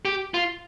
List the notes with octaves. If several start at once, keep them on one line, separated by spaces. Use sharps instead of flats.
G4
F4